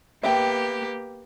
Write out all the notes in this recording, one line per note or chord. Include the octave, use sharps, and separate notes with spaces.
A#3 B3 G4 E5 G5